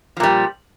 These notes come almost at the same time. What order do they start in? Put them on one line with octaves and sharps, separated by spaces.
F3 A#2 G3